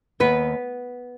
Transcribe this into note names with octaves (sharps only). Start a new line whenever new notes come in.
D#2 B3 B4